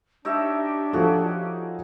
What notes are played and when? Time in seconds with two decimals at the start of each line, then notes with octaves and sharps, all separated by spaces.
0.25 D4 D#4 G4 C#5 E5
0.93 F3 F4 F#4 G#4 A4